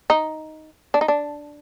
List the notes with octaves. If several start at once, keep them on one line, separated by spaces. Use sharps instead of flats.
D#4
D4
D#4
D4